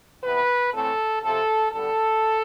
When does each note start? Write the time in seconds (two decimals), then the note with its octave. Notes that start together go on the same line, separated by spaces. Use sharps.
0.24 C3 E3 B3 B4
0.73 A2 E3 A3 C4 A4
1.22 C3 F3 C4 A4
1.71 D3 G3 B3 A4